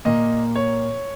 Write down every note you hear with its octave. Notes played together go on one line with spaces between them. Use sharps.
A#2 A#3 D#5
C#5